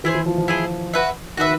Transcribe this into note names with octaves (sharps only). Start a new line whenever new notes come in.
E3 E4 G#4 C5
E3
F3
F3
E4 G#4 C5
F#4 B4 E5
D#3 F#4 B4 E5